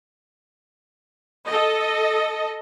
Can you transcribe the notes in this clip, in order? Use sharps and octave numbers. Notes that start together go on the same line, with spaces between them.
A4 D#5